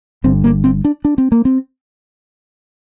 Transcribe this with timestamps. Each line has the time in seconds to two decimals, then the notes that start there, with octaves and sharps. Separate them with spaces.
0.24 G1 G2 D3 C4
0.44 A#3
0.64 C4
0.85 D4
1.05 D4
1.18 C4
1.32 A#3
1.45 C4